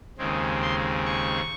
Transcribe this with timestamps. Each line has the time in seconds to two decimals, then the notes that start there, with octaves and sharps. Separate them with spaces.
0.18 D#2 C#3 G#3 C4
0.62 C6
1.06 C#6